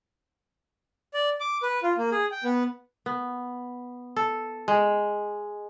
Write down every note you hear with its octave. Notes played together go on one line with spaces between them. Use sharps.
D5
D6
B4
F4
A#3
G#4
G5
B3
B3
A4
G#3